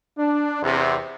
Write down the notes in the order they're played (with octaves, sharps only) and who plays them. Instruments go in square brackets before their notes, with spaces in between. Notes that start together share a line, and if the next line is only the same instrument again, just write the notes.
[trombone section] D4
E2 C3